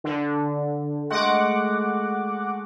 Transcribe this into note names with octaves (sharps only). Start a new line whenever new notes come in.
D3
G#3 A3 F#4 F#5 D6